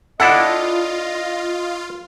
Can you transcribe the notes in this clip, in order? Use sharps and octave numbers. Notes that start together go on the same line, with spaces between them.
D4 E4 F4 A4 D#5 F#5